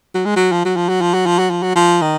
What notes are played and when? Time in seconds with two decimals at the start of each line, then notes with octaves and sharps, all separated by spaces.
0.14 F#3
0.25 G#3
0.36 F#3
0.52 F3
0.65 F#3
0.76 F3
0.89 F#3
1.01 F3
1.14 F#3
1.26 F3
1.39 F#3
1.50 F3
1.63 F#3
1.75 F3
2.01 D#3